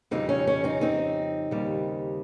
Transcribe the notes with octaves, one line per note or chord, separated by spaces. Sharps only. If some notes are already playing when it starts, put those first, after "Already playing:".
F2 C#3 G3 C4 D#4
C#4
C#4
C4 D#4
C4 D#4
D#2 C#3 G3